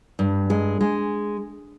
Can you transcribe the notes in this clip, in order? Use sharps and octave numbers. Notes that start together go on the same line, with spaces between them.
G2
G#3
G#3